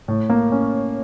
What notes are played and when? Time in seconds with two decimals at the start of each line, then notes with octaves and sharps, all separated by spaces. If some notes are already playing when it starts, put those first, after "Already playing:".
0.08 A2
0.30 A#3
0.52 C#4